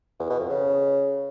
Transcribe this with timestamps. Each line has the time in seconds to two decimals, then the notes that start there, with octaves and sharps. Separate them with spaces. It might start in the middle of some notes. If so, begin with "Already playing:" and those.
0.19 E2
0.29 B2
0.39 F2
0.49 C#3